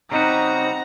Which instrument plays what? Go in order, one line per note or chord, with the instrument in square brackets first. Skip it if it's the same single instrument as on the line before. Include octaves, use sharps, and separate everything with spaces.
[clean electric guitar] C#3 G3 F#4 [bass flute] C4 [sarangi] D#4 [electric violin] F#5 A#5